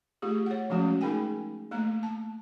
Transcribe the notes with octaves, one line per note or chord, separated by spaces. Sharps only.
A3 F4 G4 G#4
C#5 F#5
F3 G#3 A3 C#4 F#4
A3 D#4 G#4 A#4 G5 G#5
A3 A#3 F5 A#5
A5